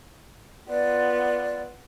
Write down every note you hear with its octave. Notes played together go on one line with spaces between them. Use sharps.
B3 F4 D5